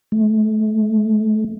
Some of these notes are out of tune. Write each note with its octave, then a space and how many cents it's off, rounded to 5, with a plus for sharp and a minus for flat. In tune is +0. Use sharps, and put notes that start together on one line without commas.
A3 -30